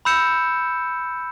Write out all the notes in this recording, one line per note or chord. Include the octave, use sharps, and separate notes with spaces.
B5 E6 G6 C#7 E7